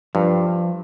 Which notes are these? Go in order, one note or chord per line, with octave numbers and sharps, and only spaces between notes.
G2 F3